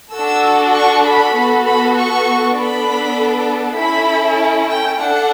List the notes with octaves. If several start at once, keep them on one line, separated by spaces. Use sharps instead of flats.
D4 F#4 A4 E6
C#6
B5
B3 F#4 A4
B5
C#6
B3 D4 A4 B5
C#4 E4 A4 B5
G5
D4 A4 F#5